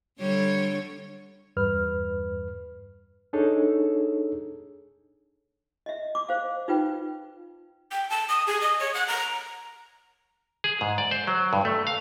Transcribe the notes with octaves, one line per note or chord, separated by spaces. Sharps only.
D3 G3 C#5
E2 G2 B4 F6
D4 D#4 G#4 A4 C#5
D#5 E5
D6
C5 F5
D#4 F4 B4 G5
G5
A5
D#6
G#4
D#5
C#5
F#5
A#5
G#4
G#2
D5
C5
F#3
G2
A3
F5